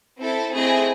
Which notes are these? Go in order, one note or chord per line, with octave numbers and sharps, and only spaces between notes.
C4 E4 A4
A3 C4 E4 G#4 D#5